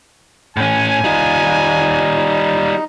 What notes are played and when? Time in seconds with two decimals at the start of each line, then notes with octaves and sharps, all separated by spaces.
0.57 A2 C#4 G#5
1.04 G3 D#4 F4